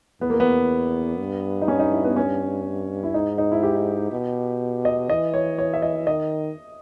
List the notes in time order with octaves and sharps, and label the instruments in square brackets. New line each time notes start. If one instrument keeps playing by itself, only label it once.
[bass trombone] E2 [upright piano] B3
[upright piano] A#3
B3
[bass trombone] G2
[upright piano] D#4
C#4
D#4
E4
B3
C#4
E4
[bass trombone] G#2 [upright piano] D#4
[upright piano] D#4
E4
G4
[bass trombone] B2
[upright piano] D#5
[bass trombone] E3 [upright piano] D#5
[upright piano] C#5
C#5
E5
D#5
[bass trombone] D#3 [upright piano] D#5